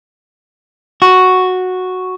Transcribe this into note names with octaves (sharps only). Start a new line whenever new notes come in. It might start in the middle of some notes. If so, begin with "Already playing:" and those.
F#4